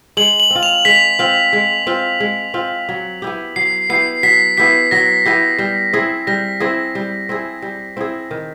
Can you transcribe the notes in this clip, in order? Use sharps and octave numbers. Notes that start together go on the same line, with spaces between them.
G#3 F#7
F#7
C4
F4
F7
G#3 B6
C4 F4
G#3
C4 F4
G#3
C4 F4
F#3
B3 E4 G4
F#3 C7
B3 E4 G4 C7
F#3 B6
B3 E4 G4 B6
F#3 A#6
B3 E4 G4
G3
C4 E4 G#4
G3 A#6
C4 E4 G#4
G3
C4 E4 G#4
G3
C4 E4 G#4
D#3